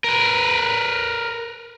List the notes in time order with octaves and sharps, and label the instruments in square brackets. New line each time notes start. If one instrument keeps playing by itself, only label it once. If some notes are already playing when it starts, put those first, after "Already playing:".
[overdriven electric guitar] A#4 B4